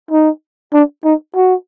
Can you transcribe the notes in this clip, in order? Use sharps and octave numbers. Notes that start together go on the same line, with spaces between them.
D#4
D4
D#4
F#4